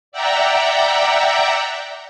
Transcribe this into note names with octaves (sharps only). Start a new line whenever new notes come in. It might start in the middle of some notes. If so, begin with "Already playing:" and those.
D5 E5 F#5 G5 A#5